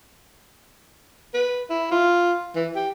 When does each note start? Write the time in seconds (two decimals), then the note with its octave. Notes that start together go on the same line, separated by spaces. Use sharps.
1.34 B4
1.70 E4
1.91 F4
2.56 E3
2.76 G4